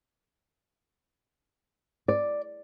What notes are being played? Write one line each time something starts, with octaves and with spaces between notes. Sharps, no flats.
D5